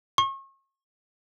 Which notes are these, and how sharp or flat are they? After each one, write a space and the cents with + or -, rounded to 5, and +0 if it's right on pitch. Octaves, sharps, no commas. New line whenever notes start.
C#6 -35